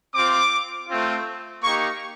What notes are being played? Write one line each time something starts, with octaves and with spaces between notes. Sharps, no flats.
C4 F4 D6
A3 C4 F4
A#3 D#4 G4 C#6